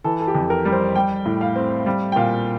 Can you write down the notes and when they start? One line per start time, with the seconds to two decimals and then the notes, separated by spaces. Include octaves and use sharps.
0.04 E3 A4
0.20 A4
0.27 G4
0.35 F2
0.50 A#4
0.65 G3
0.72 C5
0.95 G3 G5
1.26 A2
1.41 F5
1.56 C4
1.86 G3
2.12 G5
2.16 A#2 F5